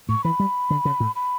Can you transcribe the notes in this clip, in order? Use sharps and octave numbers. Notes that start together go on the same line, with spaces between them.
A2 C#6
E3 B5
G3
D3
C#3
A2
B5